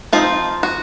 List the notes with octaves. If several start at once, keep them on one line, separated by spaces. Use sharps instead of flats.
F3 C4 D#4 F4
F#4